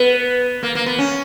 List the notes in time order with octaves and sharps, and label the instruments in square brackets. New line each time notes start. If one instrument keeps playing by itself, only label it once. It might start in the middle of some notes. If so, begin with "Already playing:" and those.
Already playing: [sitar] B3 [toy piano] B4
[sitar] A#3 [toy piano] A#4
[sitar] A#3
B3
C#4